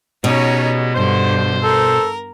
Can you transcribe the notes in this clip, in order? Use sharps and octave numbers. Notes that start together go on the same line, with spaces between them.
B2 G3 G#3 B3 C#4 D#4 C#5
G2 D3 C5
A4 A#4